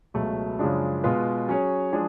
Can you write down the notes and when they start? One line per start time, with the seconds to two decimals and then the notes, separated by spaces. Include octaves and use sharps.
0.14 C#2 B2 F#3 A3
0.59 F#2 C#3 F3 G#3 D4
1.04 B2 G#3 B3 F4 B4
1.48 F#3 C#4 G#4 C#5
1.93 F3 G#3 D4 G#4